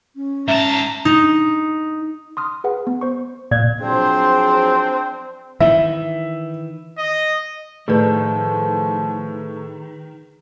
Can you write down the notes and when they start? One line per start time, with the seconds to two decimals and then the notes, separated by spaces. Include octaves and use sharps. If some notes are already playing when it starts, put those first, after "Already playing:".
0.16 C#4
0.48 G#2 E5 A5 A#5
1.05 D#4
2.37 C6 D#6 F6
2.64 G#4 B4 F#5
2.87 B3
3.01 C5 C#6
3.51 A#2 D5 G#6
3.82 F3 F#3 C4 D4 G#4 C5
5.60 D#3 E3 E5
6.99 D#5
7.88 A2 D#3 F3 G#4 B4